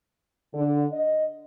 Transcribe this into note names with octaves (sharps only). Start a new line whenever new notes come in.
D3
D#5